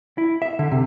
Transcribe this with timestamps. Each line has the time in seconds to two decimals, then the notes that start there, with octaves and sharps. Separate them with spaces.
0.18 E4
0.42 E5
0.59 D3
0.72 C3